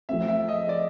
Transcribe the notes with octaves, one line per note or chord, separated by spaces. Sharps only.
F3 A3 C4 E5
E5
D#5
D5